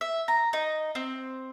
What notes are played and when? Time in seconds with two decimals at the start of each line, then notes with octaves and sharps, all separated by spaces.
0.01 E5
0.28 A#5
0.53 D#4
0.95 C4